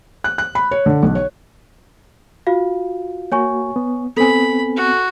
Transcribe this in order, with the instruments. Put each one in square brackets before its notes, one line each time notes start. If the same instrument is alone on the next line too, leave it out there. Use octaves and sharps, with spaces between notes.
[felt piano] F#6
F#6
B5
C#5
D3
B1
C#5
[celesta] F4 F#4 F5
[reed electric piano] A#3 F#4 [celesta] C#5 G#5 C#6
[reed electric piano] B3
[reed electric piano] B3 C4 [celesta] A4 G#5 [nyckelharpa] B5
[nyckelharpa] F#4